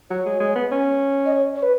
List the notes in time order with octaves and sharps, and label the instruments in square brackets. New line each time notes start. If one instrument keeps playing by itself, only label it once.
[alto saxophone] F#3 [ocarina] C#5
[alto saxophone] G#3
G#3
B3
C#4
[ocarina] D#5
C#5
C#5
B4